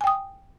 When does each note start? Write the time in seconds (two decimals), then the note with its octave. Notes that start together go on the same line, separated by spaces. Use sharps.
0.01 G#5
0.04 G5
0.07 D#6